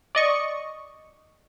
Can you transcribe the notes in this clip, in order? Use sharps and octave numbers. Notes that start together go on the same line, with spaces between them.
D5 D#5 C#6